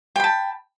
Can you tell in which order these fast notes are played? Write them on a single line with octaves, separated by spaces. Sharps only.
G5 B5 A5